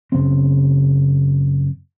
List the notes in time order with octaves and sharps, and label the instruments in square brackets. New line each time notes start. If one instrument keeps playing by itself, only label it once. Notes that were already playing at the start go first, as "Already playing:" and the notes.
[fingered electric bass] F#1 C#3 C4